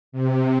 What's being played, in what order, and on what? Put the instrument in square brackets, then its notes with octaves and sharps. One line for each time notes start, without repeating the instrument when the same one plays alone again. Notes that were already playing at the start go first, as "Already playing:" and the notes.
[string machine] C3